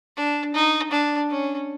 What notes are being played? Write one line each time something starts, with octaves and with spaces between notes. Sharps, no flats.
D4
D#4
D4
C#4